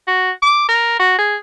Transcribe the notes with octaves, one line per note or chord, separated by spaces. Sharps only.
F#4
D6
A#4
F#4
G#4